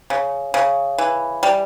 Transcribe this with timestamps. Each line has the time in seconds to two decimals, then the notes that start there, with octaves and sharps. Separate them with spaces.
0.10 C#3
0.54 C#3
0.98 E3
1.43 G3